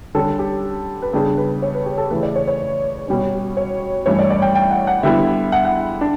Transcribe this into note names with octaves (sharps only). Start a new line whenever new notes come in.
D3 G3 C#4 A4
G4
B4
C#3 G3 B3 D4 A4
B4
C#5
B4
G4
A4
C#3 E3 A3 B4
D5
C#5
C#5
B2 G3 C#4
C#5
G2 E3 A3 C#4 E4 C#5
D5
D5
G5
G5
F#5
F#5
D3 G3 B3 E4 E5
F#5
F#5
D4